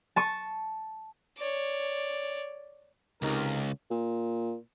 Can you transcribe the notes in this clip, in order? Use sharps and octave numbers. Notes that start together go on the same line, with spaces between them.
A5 C#6 D#7
C#5 D5
C#2 C3 D#4 A#4
A#2